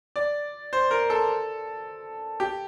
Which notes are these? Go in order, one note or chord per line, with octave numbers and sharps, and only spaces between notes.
D5
C5
A#4
A4
G4